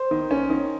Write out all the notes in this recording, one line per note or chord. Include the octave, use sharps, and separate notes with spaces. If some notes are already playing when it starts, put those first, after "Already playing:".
Already playing: C5
D#3
C#4
D#3